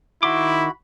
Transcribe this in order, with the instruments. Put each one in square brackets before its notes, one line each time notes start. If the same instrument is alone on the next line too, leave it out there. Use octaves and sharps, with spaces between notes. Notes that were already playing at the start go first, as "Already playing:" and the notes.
[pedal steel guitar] D#3 C6 D6 [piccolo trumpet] E4 [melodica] F#4 B5